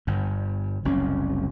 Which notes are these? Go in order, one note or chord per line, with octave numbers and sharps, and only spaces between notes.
G1 G2
F#1 C2 C#4